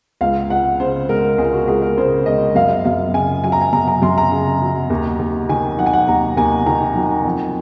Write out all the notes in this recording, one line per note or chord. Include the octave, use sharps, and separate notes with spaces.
C#2 F5
C#2 F#5
C#3 C5
G#3 A#4
C#2 G#4
F#4
C#2 G#4
A#4
C#3 C5
G#3 D#5
F#2 F5
F#2 F5
C#3 G#5
F#3 G#5
A#5
G#5
F#2 A#5
A#5
F#2 C6
A#5
C#3
F#3
D#2
D#2
D#3 G#5
F#3 F#5
G#5
F#5
D#2 A#5
D#2 G#5
D#3 A#5
F#3
F2